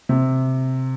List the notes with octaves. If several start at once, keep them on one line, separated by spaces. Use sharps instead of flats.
C3